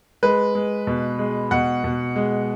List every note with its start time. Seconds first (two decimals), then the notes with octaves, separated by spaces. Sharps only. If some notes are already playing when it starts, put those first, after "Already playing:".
0.23 G#3 B4
0.55 G#3
0.87 B2
1.19 G#3
1.51 B2 F#5
1.84 B2
2.16 G#3